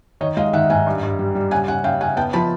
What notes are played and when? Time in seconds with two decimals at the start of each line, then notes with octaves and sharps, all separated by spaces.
0.21 D#3 C#5 D#5
0.37 G#3 D#5 F5
0.53 D#3 E5 F#5
0.70 G#2 F#5 G#5
0.86 G2
1.03 G2
1.19 G3
1.35 G3
1.51 C#3 F#5 G#5
1.68 C#3 F#5 G#5
1.84 C#3 F5 G5
2.01 C#3 F#5 G#5
2.16 B3 G5 A5
2.33 F3 A5 B5